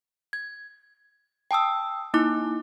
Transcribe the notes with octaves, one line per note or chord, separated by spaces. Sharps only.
G#6
G5 A5 D#6 E6
A#3 D#4 E4 D6 F#6